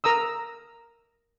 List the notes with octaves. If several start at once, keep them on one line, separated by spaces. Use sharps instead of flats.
A#4 A#5 D#6 E6